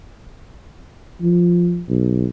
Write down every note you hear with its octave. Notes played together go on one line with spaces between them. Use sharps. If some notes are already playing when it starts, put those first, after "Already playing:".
F3
B1